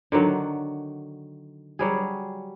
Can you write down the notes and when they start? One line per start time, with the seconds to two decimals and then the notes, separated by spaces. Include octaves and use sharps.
0.12 D3 D#3 F#3
1.79 F#3 G3 G#4